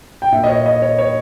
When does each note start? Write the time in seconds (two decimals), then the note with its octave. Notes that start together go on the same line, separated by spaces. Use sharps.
0.22 G5
0.32 A#2 E5
0.44 D#5
0.49 C#5
0.66 D#5
0.82 C#5
0.99 C#5